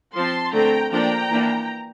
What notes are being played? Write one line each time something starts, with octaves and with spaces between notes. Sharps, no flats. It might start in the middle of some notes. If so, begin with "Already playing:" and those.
F3 C4 A5 C6
D3 A3 C4 G5 A#5
F3 A#3 D4 G5 A#5
E3 A#3 D4